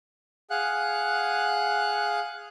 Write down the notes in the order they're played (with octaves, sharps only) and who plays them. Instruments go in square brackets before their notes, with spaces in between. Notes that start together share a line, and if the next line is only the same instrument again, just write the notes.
[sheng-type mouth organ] G#4 F5 F#5 F#6